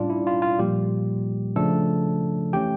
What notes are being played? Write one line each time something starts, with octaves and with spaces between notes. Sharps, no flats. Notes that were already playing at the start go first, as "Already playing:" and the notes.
Already playing: A2 G3 C#4 D4 F4 D5
E4
F4
F4
A#2 F3 G3 A#3 G4
C#3 F3 A3 D4 A4
E3 A3 C#4 G4 G5